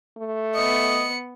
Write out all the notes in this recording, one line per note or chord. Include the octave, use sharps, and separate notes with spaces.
A3
B3 D#5 C#7